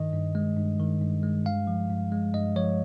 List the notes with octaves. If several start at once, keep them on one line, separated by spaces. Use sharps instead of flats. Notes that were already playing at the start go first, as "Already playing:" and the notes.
Already playing: G2 D#3 D#5
G2
G#3
G2
D#3
G2
G#3
G2 F5
F3
G2
G#3
G2 D#5
F3 C#5